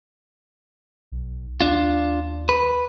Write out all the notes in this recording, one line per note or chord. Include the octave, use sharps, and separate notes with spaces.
B1
D#2 D4 F4
B4